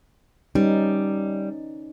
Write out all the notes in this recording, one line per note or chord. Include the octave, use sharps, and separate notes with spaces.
G3 C#4 D#4 B4